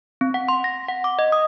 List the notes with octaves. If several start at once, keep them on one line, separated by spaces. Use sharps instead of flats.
C4
F#5
C6
A#6
F#5
D6
D#5
D#6